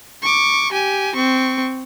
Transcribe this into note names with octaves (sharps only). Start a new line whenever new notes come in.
C#6 D6
G4 G#5
C4 C#6